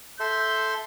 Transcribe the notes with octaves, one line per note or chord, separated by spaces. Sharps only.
A4 E5 C6 G6